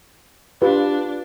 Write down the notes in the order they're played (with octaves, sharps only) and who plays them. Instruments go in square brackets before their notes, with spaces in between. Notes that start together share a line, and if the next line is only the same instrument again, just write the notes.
[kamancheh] D4 [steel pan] F4 G4 B4